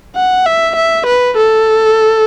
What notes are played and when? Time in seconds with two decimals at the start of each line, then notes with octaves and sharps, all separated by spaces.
0.15 F#5
0.46 E5
0.75 E5
1.06 B4
1.37 A4